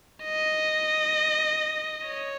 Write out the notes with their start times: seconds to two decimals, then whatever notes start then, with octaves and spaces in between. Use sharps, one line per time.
0.23 D#5
2.07 C#5